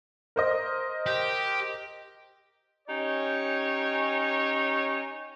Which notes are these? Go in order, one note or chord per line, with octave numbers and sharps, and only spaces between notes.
A#4 C5 D#5
G4
C#4 D#4 G4 C#5